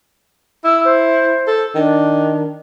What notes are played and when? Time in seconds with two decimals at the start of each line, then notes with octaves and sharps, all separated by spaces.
0.65 E4 E6
0.85 C5
1.47 A4
1.75 D#3 D4